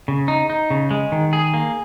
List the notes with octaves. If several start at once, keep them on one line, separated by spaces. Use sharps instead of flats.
C#3
D#4
D#4
C#3
G#3
D#3
G#4
A#3